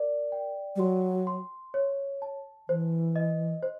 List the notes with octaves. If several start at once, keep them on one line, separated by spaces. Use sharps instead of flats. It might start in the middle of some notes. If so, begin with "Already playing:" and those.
Already playing: A#4 D5
G5
G3
F#3 C6
C6
C#5
A5
E3 C5
D#5
C5